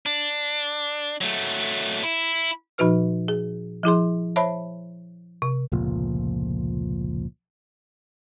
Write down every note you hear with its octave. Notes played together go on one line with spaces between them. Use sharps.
D4
F#3 A3
E4
A#2 F3 D#4 F#4 B4 F6
G#4
F3 E4 G#4 C6
C5 C#5 E5 A5 B5
C3
F1 C#2 A#2 F3